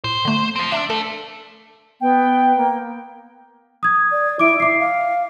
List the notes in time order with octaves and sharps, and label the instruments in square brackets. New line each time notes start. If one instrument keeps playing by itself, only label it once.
[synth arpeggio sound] A2 [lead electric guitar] C5
[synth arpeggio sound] D3 A3
[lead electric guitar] F3 C4
[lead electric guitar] D4 [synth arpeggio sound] E5 A5 E6
[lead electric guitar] A3 [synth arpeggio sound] A4
[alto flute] B3 [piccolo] G5
[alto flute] A#3
[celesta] D#6 G#6
[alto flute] D5
[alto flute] E4 [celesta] D6 D7
[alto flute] E5 [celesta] D6 C7
[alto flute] F5